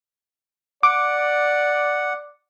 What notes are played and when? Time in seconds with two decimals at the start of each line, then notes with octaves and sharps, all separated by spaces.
0.83 D5 F#5 D6